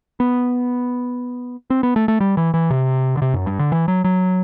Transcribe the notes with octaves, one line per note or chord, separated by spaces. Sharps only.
B3
C4
B3
A3
A3
G3
E3
E3
C3
D3
C3
F#2
G2
D3
E3
F#3
F#3